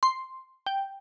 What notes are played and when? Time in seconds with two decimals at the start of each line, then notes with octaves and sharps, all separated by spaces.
0.03 C6
0.66 G5